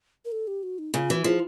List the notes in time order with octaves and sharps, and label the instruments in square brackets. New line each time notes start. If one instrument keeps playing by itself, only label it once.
[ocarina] A#4
A4
G4
F#4
D#4
[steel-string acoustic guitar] C#3 [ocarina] F4
[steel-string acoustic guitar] E3 [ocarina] F#4
[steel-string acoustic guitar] F3 [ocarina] G#4